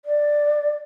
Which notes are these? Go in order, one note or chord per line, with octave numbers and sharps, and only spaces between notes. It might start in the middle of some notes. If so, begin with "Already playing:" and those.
D5